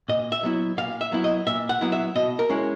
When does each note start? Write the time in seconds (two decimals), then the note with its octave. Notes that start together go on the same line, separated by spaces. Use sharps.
0.09 A#2 D#5
0.32 E5
0.43 F#3 B3 E4
0.77 A#2 F5
1.01 E5
1.12 F#3 B3 E4
1.24 D#5
1.47 A#2 E5
1.69 F#5
1.81 F#3 B3 E4
1.92 E5
2.15 B2 D#5
2.39 A#4
2.50 G#3 C#4 E4